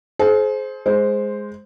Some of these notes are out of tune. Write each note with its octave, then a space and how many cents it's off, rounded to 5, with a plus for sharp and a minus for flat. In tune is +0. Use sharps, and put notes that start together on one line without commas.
G#4 +40 C5 +0
G#3 +0 C5 +0